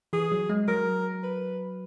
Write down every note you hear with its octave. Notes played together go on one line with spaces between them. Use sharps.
E3 G#4
F#3
G#3
F#3 A#4
B4